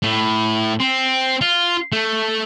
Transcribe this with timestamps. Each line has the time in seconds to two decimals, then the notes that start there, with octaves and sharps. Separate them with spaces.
0.03 A2
0.80 C4
1.41 F4
1.92 A3